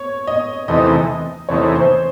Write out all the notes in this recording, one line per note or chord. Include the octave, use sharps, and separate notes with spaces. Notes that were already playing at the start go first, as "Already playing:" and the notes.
Already playing: C#5
D#5
E2 C3 E3 A3 D#4 D#5
E2 C3 E3 A3 D#4 C#5
C5